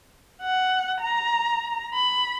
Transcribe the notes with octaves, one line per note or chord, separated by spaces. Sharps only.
F#5
A#5
B5